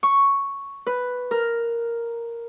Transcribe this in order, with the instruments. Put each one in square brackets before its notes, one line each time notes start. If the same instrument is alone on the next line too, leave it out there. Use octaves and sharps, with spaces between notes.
[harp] C#6
B4
A#4